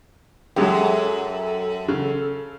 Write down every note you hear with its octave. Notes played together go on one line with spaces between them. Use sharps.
F#2 F#3 G#3 G4 A4
C#3